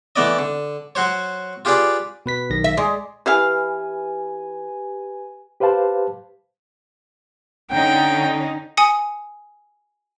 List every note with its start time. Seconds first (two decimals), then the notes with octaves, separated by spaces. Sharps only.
0.16 E3 A3 B3 D5 D#5
0.39 D3
0.95 F#3 F#4 C5 C#5
1.65 F4 G4 G#4 B4 D5
2.26 B2 B4 B6
2.50 B1 D#3 A#6
2.64 E5
2.77 G#3 D5
3.26 E3 E4 G4 B4 F5 G#5
5.60 G4 B4 C5 F5 A5
7.71 D3 C#4 D#4 G5
8.77 G#5 D#6 C#7